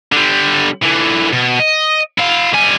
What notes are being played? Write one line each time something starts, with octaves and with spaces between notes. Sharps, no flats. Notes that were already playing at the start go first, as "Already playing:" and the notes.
D3 G3
D3 E3
B2
D#5
E4 F5
G3 G#5